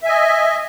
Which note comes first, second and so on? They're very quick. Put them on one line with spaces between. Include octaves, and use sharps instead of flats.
E5 G#5 D#5